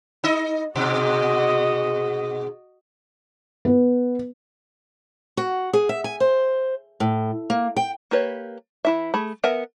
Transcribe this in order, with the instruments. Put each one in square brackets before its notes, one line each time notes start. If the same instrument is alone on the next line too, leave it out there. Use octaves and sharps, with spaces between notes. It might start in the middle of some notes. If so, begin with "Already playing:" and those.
[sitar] D#4 D#5
[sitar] G#2 B2 [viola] F#4 D#5
[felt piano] B3
[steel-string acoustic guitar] F#4
G#4
E5
G#5
C5
A2
A#3
G5
[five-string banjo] A#3 G4 B4 C#5
E3 E4 E5
A3 G#4 B5
B3 A#4 E5 F#5 G#5